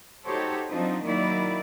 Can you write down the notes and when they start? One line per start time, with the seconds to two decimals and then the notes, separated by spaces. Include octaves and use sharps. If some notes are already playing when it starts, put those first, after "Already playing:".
0.24 D#4 F#4 G4 A4 C5 C#5
0.69 F3 F#3 C4 D4 D#4
1.02 D#3 F#3 A#3 D#4 E4 D5